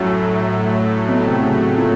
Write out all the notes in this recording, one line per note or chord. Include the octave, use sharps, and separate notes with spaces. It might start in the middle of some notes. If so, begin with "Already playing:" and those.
Already playing: F#2 A2 F#3 A3
B2
C3
C#3
C3
A#2